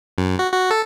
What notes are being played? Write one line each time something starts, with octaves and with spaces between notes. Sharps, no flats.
F#2
F#4
F#4
A4